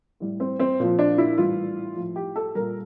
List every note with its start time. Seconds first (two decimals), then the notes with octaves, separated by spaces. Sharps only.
0.20 A2 G3
0.40 C4
0.60 C4
0.80 A#2 F3
0.99 D4
1.18 E4
1.37 A2 E3 G3 F4
1.96 A2 F3
2.16 G4
2.36 A4
2.55 A#2 G3 A#4